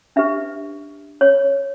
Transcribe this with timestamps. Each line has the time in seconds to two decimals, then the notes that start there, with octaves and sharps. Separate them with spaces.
0.16 D4 G4 B4 E5
1.21 C#5